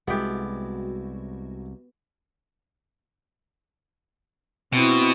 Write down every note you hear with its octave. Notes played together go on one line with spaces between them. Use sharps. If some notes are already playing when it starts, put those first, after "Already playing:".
C2 G#3 B3 E4 F#4 G4 A4
B2 C4 E4